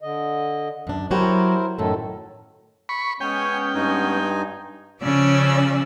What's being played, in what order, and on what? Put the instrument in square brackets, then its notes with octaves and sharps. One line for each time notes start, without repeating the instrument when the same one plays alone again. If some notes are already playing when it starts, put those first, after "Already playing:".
[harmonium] D3 D#5
[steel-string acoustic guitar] F#2 D4
[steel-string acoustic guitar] F#3 F#4 G4 [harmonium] E4 A#4 C5
[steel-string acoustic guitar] F#2 A2 [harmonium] D#3 F#3 A4
[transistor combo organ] B5 C#6
[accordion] G#3 B3 C#4 [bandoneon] C#5 G#5 [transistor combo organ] G5
[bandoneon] G2 D#4 G#5
[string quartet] C#3 F3 C#4 D5 E6